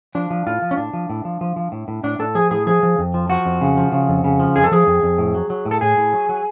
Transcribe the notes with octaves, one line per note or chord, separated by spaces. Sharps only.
F3 D4
F3
A2 F4
F3
C#4
A2 D4
F3
A2
F3
F3
F3
A2
A2
A2 D4
A2 A4
F3 G#4
A2 G#4
F3 G#4
F3
F2
F3
F3 F#4
F2
C#3
F3
C#3
F2
C#3
F3
F2 G#4
A4
F3 G#4
F2
F2
A2
F#3
F#3
A2
A4
A2 G#4
A2
F#3
F#3